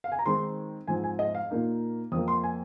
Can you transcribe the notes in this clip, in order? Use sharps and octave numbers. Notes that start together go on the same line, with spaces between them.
F5
G#5
A#5
D#3 G#3 C4 D#4 C6
G#2 F3 C4 G#5
G#5
D#5
F5
A#2 A#3 D#4
F2 F3 A#3 D#6
C6
G#5